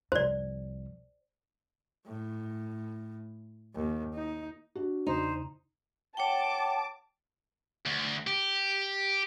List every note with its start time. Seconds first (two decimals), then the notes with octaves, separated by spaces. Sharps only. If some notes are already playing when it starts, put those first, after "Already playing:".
0.12 C2 F2 C5 D5
2.07 A2
3.75 D#2
4.15 D#4
4.75 D4 F#4
5.07 E2 C#3 D#4 C5
6.17 C#5 F#5 G5 A5 D6
7.86 D2
8.27 G4